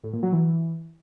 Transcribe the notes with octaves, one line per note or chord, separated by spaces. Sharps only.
A2
A#2
F#3
E3